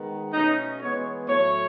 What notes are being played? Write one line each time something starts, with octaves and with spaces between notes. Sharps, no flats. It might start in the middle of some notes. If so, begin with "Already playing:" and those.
Already playing: D#3 G#3 B3
B2 A3 C#4 D#4
E3 G#3 B3 C#5
A2 F#3 A3 C#5